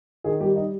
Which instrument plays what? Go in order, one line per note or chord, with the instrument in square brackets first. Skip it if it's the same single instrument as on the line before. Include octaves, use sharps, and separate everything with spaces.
[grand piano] D#3 G#4
G3 G4
D#4